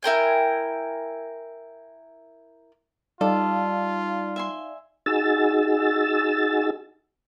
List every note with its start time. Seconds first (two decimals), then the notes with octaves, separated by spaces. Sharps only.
0.03 E4 A#4 G5 G#5
3.21 G3 D#4 F4 A4 D5 F5
4.36 E5 G#5 C6
5.06 D#4 F#4 G#4 E6 A6